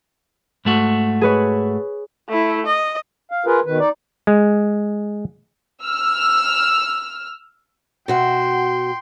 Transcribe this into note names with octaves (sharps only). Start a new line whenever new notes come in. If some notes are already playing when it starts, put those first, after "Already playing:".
G#2 A3 F#4
G#4 B4 C#5
A3 E4
D#5
F5
F4 G#4 A#4 B4
B2 D#3 B4
D#4 D5
G#3
E6 F6
B2 F#4 E5 G5 C6